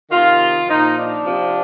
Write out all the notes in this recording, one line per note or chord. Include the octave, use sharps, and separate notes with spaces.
C3 D#3 F4
A#2 F3 D#4
D4
C3 F3